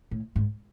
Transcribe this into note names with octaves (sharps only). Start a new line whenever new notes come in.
A2
G#2